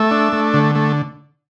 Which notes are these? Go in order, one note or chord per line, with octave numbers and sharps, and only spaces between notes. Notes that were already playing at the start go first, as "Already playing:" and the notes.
Already playing: A3 E5
D4
A3
D3
A3